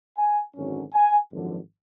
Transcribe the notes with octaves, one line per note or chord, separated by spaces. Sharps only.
G#5
G#1 F#2 D3 F#3 C#4
G#5
G#1 F#2 D3 F3